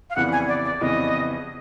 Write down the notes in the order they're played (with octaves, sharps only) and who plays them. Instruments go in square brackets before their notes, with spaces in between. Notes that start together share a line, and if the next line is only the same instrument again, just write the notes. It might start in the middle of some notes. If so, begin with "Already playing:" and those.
[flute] F5
[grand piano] F2 C#3 E3 G3 B3 [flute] F#5
[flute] G#5
D5
D5
[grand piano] F2 C#3 E3 G3 B3 [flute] D#5